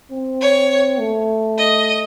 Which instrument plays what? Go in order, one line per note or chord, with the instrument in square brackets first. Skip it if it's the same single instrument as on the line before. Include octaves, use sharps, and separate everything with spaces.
[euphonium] C4
[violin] C#5
[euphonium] A3
[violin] D#5